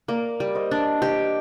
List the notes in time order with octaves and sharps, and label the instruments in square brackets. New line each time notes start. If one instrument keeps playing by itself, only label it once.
[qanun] A#3 [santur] A#4 D5
[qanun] G3
[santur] C5 D#5
[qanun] D4
[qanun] G4 [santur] C5 D#5